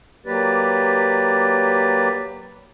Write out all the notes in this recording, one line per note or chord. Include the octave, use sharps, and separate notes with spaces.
F#3 A#3 G4 B4 D5